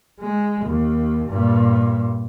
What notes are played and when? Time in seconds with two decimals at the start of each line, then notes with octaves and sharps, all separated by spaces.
0.20 G#3
0.65 D#2
1.28 G2 A#2